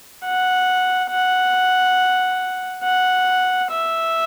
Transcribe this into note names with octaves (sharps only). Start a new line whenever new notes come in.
F#5
F#5
F#5
E5